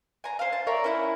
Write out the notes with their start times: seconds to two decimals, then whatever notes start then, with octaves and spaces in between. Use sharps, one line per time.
0.24 G#5 A#5
0.39 C5 F5
0.53 A5
0.67 A#4 C#5 D5 E5
0.84 C#4 E4 F#5